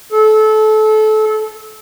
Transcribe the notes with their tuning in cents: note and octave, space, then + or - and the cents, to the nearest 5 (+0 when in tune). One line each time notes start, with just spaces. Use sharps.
A4 -25